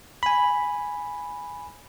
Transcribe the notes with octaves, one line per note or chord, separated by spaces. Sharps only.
G#5 B5